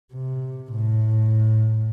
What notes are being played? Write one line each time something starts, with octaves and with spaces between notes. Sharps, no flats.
C3
A2